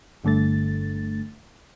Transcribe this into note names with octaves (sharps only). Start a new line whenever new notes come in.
G1 G2 D3 A3 A6